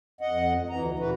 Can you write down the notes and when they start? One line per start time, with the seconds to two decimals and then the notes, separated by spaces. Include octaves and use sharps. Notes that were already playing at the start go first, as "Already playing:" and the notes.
0.21 F2 D#5 F#5
0.70 D2 E3 A#5
0.99 A#2 C#3 E3 F#4 B4